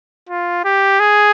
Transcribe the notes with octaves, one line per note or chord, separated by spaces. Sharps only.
F4
G4
G#4